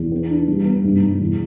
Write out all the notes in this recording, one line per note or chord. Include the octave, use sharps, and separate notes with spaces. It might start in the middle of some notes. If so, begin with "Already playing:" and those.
Already playing: E2
B3
D4
G3
B3
G2
G2
E2